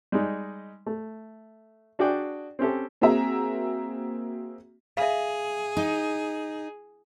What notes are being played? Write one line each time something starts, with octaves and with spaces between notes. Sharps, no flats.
G3 G#3 D#4
A3
D4 F#4 G#4 D5 G5
C4 C#4 G4 A4
A#3 C4 F#4 G#4 E5 A#5
G#4 E5 F5
D#4